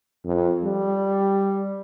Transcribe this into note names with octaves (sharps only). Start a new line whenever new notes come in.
F2
G3